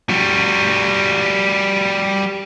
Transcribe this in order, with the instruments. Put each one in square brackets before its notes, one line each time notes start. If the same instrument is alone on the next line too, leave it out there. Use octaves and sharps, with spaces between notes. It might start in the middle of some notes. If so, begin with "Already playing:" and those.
[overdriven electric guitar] G3 F#4